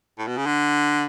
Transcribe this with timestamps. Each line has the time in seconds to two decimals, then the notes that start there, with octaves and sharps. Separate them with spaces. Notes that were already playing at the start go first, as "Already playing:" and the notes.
0.18 A2
0.27 B2
0.37 C#3
0.46 D3